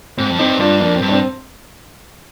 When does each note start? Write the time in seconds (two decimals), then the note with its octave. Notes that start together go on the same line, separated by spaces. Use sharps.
0.18 G#2 C4
0.30 F2
0.39 G2 C4 D#4
0.59 G2 D4 F4
0.80 F2 A#3 D4
0.96 C4
1.02 G2
1.09 D4
1.12 C4